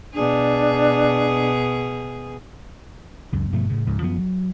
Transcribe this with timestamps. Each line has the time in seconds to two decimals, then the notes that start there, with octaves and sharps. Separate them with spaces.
0.14 B2 D4 G#4
3.32 C#2 F#2
3.52 G2 B2 F3 A3
3.70 A2 C#3
3.86 C#2 G#2 F3
4.01 F#2 F3 F#3 B3
4.19 F#3